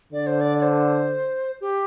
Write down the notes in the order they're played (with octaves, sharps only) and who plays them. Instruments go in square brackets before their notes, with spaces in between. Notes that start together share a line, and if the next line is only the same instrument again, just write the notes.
[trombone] D3 [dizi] D5
[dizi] C5
D5
D5
C5
G4